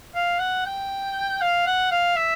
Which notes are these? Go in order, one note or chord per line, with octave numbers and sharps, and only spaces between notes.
F5
F#5
G5
F5
F#5
F5
E5